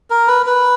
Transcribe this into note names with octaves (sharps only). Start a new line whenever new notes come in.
A#4
B4
B4